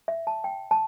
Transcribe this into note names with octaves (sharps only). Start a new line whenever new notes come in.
E5
A5
G5
A5